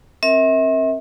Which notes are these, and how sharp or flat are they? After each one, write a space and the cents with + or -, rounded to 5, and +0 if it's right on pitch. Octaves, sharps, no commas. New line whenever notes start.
C4 +40 A#4 +0 E5 -35